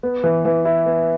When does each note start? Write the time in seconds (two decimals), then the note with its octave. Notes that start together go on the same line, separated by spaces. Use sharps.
0.03 B3
0.24 E3
0.45 E3
0.65 E4
0.86 B3